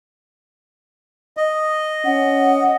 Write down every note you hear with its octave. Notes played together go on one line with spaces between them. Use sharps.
D#5
C#4 F#5